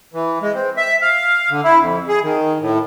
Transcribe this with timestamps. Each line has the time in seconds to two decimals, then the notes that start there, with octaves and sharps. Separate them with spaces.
0.14 E3
0.42 G#3
0.54 C4
0.77 E5
1.02 F5
1.50 D3
1.64 E4
1.80 F2
2.08 G#4
2.23 D#3
2.61 A2